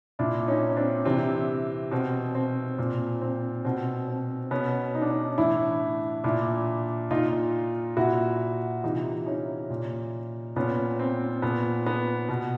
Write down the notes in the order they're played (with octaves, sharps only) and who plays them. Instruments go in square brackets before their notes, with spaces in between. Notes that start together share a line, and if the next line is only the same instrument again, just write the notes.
[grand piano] A#2 D4 E4
C#4 D#4
C4 D4
C3 E3 C4
B2 C4
C4
A#2 C4
C4
B2 C4
C4
B2 B3 C#4
D#4
D4
C#4 D#4
A2 E3 D4 E4
A#2 D4 E4
A#2 D#4 F4
A#2 E4 F#4
C3 E3 D#4 F4
C#4 D#4
A#2
A#2 B3 C#4
C4
A#2 B3
B3
B2